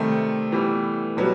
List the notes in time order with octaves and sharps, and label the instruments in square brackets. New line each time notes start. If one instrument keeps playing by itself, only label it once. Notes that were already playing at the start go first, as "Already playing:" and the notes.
Already playing: [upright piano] C3 D#3 G3 C4 [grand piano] A3
[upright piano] E3 G3 B3
[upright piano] B2 G3 B3 [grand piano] F#3